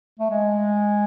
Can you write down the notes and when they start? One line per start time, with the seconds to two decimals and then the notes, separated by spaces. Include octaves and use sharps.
0.19 A3
0.30 G#3